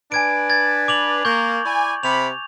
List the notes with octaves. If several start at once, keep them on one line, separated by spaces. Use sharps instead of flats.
D4 B4 G#5 G#6 D7
G#6 A6
D6 F7 F#7
A#3 C#6 G6
E4 D5 G#5
C3 B5 F7